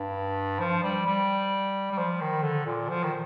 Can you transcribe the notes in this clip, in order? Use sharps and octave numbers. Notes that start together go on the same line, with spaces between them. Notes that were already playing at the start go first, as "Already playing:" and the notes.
Already playing: G2
F3
G3
G3
G3
F3
D#3
D3
A#2
F3
D#3